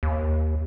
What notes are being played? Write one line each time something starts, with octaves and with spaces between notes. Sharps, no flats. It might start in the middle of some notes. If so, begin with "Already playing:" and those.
D#2